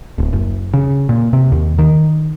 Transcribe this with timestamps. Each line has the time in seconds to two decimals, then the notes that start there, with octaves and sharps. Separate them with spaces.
0.18 D1
0.33 F#1
0.74 C#3
1.09 A#2
1.33 C3
1.52 D#2
1.79 D#3